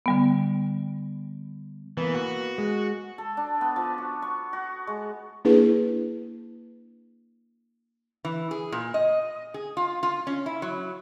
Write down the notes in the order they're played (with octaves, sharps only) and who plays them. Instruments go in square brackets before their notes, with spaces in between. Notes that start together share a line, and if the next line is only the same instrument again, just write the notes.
[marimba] D3 G3 B3
[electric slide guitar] E3 [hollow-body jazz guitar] A#3 B3
[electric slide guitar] F#4
[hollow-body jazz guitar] G#3
[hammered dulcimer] A4
D4
B3
F3
F#4
C#6
F#4
G#3
[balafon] A#3 D4 E4 G#4 B4
[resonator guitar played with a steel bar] E3
G#4
A#2
D#5
G#4
F4
F4
C#4
E4
F#3